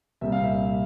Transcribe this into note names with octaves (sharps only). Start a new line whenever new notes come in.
C2 A#2 G3 C4 E5
F5
E5